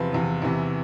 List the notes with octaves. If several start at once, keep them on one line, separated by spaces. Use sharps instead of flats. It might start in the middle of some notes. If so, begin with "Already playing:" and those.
Already playing: E2 C3 F3 B4
E2 C3 F3
E2 C3 E3